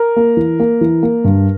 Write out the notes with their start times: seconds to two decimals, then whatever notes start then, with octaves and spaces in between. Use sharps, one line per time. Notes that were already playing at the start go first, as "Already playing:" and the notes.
Already playing: A#4
0.16 A#3
0.37 E3
0.60 A#3
0.81 E3
1.03 A#3
1.24 G2